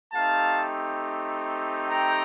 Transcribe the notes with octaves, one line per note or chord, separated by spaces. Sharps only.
A3 C4 D#4 G4 F5 A5
G5 A#5